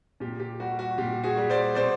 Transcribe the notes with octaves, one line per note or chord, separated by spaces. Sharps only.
A#2 G4
G4
G3 F#4
F#4
A#2 G4
F#4 G#4
G3
C5 D5
B2 C5 D5